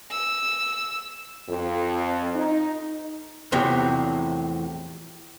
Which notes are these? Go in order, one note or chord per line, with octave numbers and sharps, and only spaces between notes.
E6
F2
D#4
E2 A2 C3 F3 F#3